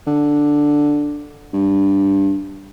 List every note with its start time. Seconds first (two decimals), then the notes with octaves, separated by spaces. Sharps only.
0.07 D3
1.53 G2